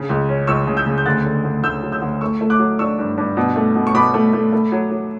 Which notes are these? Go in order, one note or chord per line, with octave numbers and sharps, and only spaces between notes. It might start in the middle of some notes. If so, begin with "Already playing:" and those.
Already playing: C#3
C#2
C#4
C#2 C#6 E6
C#3
E6 G6
C#3
G6
D2 F#6 A6
D3
D2
D2 E6 G6
F#3
E6 G6
D2
A3 C#6 E6
A3
D6 F#6
F#3
D4 C#6 E6
G2
G2
B2
A3
B2
C#6
B2 B5 D6
A3
A3
A3
F#3
F#3